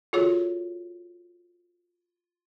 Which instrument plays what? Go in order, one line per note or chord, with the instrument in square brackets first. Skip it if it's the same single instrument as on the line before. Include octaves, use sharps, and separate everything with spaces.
[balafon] F4 F#4 G#4 A4 C#5